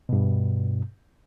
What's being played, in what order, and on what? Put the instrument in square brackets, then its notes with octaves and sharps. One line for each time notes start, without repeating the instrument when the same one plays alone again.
[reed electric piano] G2 B2